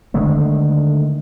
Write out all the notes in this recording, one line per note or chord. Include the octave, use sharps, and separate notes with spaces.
D3 D#3 G#3 A3